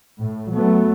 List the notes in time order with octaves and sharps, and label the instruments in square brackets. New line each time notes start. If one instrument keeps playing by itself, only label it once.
[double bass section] A2
F#3 A3 B3